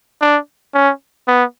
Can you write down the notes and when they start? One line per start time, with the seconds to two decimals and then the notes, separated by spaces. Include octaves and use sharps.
0.21 D4
0.74 C#4
1.28 B3